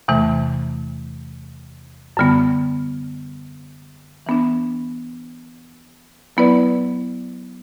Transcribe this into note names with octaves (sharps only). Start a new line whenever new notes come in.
E2 C3 E3 A3
F#2 D3 G3 B3
E3 B3 D4
F#3 B3 E4 B4 D5